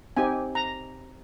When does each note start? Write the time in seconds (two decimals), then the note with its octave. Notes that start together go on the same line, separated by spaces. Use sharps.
0.17 C4 D#4 G4 G#5
0.55 A#5